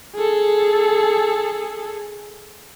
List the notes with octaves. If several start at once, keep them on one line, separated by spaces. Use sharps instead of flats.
G#4 A4